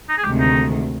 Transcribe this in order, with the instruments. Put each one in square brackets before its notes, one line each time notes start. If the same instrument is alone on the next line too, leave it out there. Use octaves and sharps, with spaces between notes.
[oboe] D#4
G#4
[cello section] D2 C3 D#3 G#3 [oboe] G4
[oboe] D#4